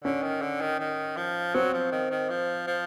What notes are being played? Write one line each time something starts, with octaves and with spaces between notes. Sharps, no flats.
D3 C#4
D#3
D3
D#3
D#3
F3
F#3 C4
F3
D#3
D#3
F3
F3